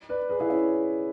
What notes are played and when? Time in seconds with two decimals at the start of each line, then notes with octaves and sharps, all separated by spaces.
0.09 B4 D5
0.30 G#4 B4
0.40 E4 G#4
0.50 C#4 E4